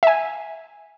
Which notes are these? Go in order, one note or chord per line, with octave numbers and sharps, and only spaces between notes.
E5 G#5